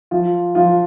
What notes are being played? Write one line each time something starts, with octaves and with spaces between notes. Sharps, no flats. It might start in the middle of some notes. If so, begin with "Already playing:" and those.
F3 F4
F3 F4